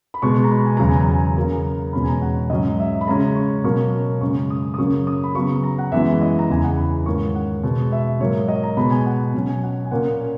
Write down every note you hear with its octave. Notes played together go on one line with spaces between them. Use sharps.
B5
B2 G#3 B3 C#6
A#5
B5
G#5
E2 C#3 F#3 A#5
G#5
A#5
G#5
C#3 F#3 A#3 A#5
E2 B2 G#3 C#4 B5
G#5
A#5
F#5
G#2 F#3 C#4 D#5
E5
B5
C#3 G#3 C#4 A#5
C#6
B2 F#3 A#3 C#4 C#6
F#2 C#3 G#3 C#6
D#6
D#6
F#2 C#3 F#3 A#3 C#4 C#6
D#6
B5
C#3 F#3 B3 C#6
A#5
F#5
F#2 E3 G#3 B3 E5
D#5
A#5
E2 C#3 E3 G#5
F#5
B5
G#2 D#3 A#3 C#4 C#6
F#5
B2 G#3 B3
E5
G#2 F#3 A#3 C#5
D#5
A#5
B2 G#3 B3 B5
G#5
F#5
B2 F#3 C#4
G#5
F#5
G#5
A#2 A#3 C#4 F#5